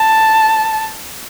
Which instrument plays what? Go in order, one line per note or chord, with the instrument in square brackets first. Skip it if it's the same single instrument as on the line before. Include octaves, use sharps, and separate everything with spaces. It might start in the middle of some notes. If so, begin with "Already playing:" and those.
Already playing: [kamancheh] A5